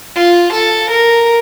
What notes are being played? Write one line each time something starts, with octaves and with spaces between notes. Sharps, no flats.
F4
A4
A#4